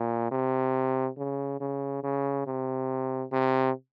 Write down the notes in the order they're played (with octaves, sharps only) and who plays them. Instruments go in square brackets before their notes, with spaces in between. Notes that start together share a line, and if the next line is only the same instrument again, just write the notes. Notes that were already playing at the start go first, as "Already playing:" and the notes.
Already playing: [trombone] A#2
C3
C#3
C#3
C#3
C3
C3